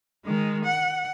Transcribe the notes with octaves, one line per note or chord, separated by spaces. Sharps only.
D#3 G#3
F#5